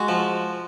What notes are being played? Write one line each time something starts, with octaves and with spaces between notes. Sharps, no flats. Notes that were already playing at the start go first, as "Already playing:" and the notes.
Already playing: G#3 F#4
F3